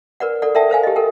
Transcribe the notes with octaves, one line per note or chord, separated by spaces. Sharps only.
A#4 B4 D5 F#5
A4 D5 F#5
A4 A#4 D5 E5 G5 A5
A#4 C5 F5 G#5
G4 D#5
A4 A#4 G5